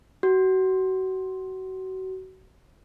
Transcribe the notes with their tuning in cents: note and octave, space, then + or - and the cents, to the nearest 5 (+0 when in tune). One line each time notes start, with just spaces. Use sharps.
F#4 +30